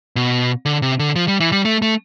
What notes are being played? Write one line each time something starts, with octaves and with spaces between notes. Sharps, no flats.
B2
D3
C3
D3
F3
G3
E3
G3
A3
A3